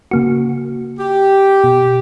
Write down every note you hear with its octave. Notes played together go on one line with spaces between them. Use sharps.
C#3 A#3 F#4
G4
B2